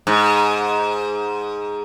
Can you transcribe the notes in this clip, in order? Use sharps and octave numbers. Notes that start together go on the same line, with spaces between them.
G#2